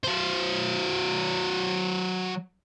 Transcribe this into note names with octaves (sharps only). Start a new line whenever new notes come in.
F#3 C5